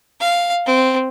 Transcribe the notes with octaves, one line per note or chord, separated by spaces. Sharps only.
F5
C4